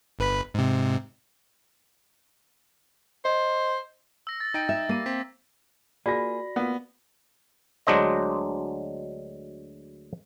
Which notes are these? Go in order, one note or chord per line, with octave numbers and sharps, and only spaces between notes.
G1 B4 B5
G#2 C3
C5 D#5
E6 A#6
A6
D#4 G5 D7
E5
G3 A#3 D#7
C4 B6
A#3 F4 F#4 G#4 D5 B5 A#6
A#3 B3 F4
D2 F#3 G#3 D4 C5 D#5